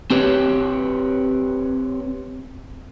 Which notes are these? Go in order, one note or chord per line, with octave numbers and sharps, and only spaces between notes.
C4 G4 B4 C#5